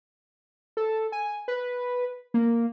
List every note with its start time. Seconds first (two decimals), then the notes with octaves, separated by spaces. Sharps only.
0.77 A4
1.12 G#5
1.48 B4
2.34 A#3